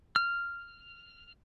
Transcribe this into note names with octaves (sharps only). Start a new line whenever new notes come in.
F6